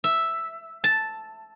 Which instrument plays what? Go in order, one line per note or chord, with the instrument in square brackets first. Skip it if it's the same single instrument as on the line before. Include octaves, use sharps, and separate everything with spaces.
[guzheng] E5
A5